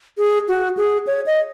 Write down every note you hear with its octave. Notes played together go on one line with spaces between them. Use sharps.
G#4
F#4
G#4
C#5
D#5